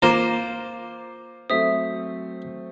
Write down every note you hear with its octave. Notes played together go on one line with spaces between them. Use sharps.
A#3 F4 C5 A#5 D6
F#3 A3 C4 E5 D#6